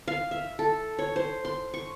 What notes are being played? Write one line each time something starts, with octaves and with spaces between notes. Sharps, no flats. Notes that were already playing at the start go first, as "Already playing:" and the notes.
F5
E5
A4
C#5
C5
C6
C#6